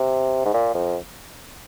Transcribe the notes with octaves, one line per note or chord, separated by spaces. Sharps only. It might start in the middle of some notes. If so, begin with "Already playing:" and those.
Already playing: C3
G#2
A#2
F2